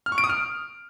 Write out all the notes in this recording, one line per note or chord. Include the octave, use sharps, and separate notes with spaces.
F6
C#6
D7
D#6
F6